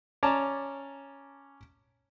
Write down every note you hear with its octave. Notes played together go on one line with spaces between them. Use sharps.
C#4 D5 A5 A#5